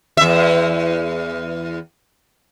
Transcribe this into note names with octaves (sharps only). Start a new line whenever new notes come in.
E2 E5